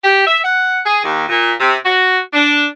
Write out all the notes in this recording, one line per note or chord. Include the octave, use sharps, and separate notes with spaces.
G4
E5
F#5
G#4
D#2
A#2
C3
F#4
D4